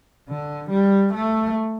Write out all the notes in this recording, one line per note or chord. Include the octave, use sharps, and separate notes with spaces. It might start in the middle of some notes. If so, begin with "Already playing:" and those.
D3
G3
A3